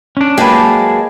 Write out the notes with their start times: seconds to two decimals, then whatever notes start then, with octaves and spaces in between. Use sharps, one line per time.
0.17 C#4 D4
0.38 F#3 G#3 A#3 G4 G#4 B4 A5